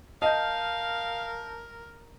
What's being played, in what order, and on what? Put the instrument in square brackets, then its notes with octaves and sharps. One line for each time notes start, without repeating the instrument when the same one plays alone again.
[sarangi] A#4 [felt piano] D#5 [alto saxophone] F5 [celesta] A5 G6